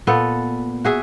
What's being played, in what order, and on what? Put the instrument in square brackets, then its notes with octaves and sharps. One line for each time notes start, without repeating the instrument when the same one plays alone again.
[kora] A#2 B3 A4
F#4 G#4 E5